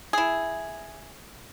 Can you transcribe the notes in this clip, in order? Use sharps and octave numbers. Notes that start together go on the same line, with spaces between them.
E4 G#4